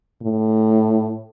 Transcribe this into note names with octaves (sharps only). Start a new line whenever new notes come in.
A2